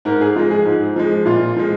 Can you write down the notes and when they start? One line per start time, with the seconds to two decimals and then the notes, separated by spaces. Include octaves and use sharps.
0.05 G#2 A#4
0.21 G#4
0.36 F3 F4
0.39 G#3
0.51 G#4
0.65 G#2
0.96 F3 G#3
1.25 A#2 F4
1.56 F3 G#3